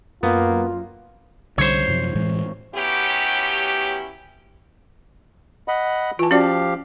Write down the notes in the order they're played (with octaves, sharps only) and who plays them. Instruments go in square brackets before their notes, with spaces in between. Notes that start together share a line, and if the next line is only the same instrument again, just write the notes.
[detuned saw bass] F#2 [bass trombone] A#3 [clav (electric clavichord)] B3 [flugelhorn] F4
[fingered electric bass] C2 D3 G3 [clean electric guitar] C5 C#5
[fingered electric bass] F#2 C3 F3
A2 E3 G#3
[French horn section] F#3 B3 C#4 E4 G4
[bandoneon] D#5 F#5 B5
[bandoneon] E3 [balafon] F4 A5
[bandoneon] F3 G4 F5 [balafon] C#4 F#4 D5